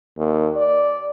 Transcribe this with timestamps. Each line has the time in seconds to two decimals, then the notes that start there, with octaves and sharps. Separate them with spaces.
0.18 D#2
0.56 D5